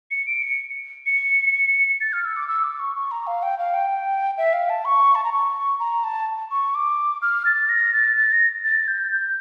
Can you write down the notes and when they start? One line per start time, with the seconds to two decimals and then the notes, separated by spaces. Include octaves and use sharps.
0.11 C#7
0.27 D7
0.42 C#7
1.06 C#7
2.01 A6
2.13 F6
2.24 E6
2.36 D6
2.48 E6
2.64 D6
2.79 C#6
2.95 C#6
3.11 A#5
3.27 F5
3.43 G5
3.58 F5
3.74 G5
4.37 E5
4.53 F5
4.69 A5
4.85 C#6
5.15 A5
5.24 A#5
5.33 C#6
5.80 A#5
6.04 A5
6.51 C#6
6.75 D6
7.22 F6
7.46 A6
7.69 A#6
7.93 A6
8.17 A6
8.32 A#6
8.64 A6
8.88 G6
9.12 G6